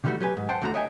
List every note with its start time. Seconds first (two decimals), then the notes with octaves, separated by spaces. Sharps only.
0.04 C3 D#3 E3 G3 A3 F#4
0.20 F#3 G4 B4 G#5
0.37 G#2
0.49 C5 F#5 G5 A5
0.62 E2 D3 A3 F#4 F#5 A#5
0.74 C#5 D#5 E5 G5 G#5